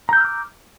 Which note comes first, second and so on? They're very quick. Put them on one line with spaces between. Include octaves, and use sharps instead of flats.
A#5 G6 E6 F6 D6